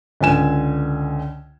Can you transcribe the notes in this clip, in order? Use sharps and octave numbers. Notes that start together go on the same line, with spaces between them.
C#2 D3 G#5 E7